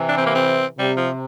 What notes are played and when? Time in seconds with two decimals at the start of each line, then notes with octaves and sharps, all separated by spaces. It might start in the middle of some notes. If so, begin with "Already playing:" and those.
Already playing: C3 E3
0.09 D4
0.18 C4
0.27 A#3
0.35 C4
0.79 C3 G3
0.97 F3